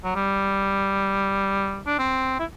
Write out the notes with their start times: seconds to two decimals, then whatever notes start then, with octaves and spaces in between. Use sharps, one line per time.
0.04 F#3
0.15 G3
1.87 D4
1.99 C4
2.40 E4